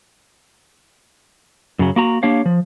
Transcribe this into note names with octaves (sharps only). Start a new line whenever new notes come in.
F#2 C#3 F#3
A#3 F#4 A#5
A#3 D4 G4 C#5 F5
F3